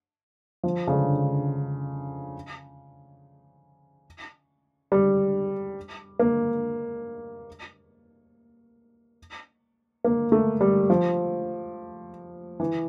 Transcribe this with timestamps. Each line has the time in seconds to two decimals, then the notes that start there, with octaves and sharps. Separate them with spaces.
0.64 F3
0.87 C#3
0.92 D3
4.92 G3
6.19 A#3
10.04 A#3
10.32 A3
10.61 G3
10.90 F3
12.60 E3